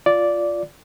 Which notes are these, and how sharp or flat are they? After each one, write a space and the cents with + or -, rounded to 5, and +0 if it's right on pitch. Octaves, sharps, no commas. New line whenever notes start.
F4 +0 D5 -10